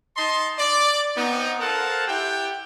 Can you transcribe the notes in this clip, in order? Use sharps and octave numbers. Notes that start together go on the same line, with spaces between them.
D#4 D#5 A5 C6
D5
B3 C4 D#4
A4 A#4 C5 F5 F#5 A5
E4 G4 F#5 G5